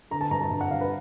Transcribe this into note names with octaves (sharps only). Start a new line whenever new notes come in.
D3 A#5
A5
G2 A#5
A5
G2
F#5
G3 F5
B4